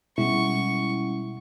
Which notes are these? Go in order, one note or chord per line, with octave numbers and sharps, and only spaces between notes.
B2 G3 G#3 C#4 E4 F#5 C#6